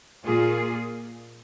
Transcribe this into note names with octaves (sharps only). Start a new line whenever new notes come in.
A#2 A#3 F4 G#4